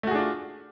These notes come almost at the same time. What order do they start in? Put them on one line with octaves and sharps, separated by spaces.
A3 F#4 G#4 D4 F4